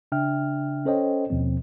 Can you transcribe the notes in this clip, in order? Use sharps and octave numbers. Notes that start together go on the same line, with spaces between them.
C#3 D4 E5 G5 F6
C#4 A4 C5 C#5 D#5 G5
D#2 B2 F3 C4